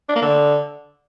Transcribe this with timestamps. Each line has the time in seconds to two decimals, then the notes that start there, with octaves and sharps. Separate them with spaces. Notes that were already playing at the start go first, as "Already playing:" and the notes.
0.09 D4
0.15 A#3
0.22 D3